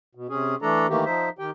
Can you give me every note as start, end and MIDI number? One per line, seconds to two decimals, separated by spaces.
0.15 0.27 47
0.29 0.55 48
0.29 0.55 61
0.29 0.55 68
0.62 0.87 52
0.62 0.87 57
0.62 0.87 62
0.62 0.87 69
0.62 0.87 82
0.89 1.05 51
0.89 1.05 52
0.89 1.05 57
0.89 1.05 58
0.89 1.05 67
1.05 1.29 53
1.05 1.29 63
1.05 1.29 72
1.05 1.29 76
1.39 1.50 51
1.39 1.50 67
1.39 1.50 79